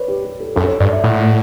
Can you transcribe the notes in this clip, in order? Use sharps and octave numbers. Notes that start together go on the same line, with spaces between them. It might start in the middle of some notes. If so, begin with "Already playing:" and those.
Already playing: B4 C#5 D5
G4
G4
A4
F#2 A4
C#5
G2 D5
E5
A2 F#5